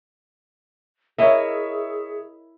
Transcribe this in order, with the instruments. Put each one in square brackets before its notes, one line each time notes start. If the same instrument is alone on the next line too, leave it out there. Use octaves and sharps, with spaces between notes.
[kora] E4 A#4 D#5 [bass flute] G#4 [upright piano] C#5 E5